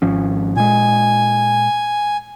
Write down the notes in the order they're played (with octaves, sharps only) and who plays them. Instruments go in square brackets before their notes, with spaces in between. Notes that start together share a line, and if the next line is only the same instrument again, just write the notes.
[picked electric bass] G#1 F3 C#4
[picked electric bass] A#2 G#3 [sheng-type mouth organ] G#5